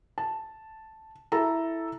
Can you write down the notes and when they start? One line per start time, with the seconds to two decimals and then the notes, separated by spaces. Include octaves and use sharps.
0.18 A5
1.32 E4 A4 A#5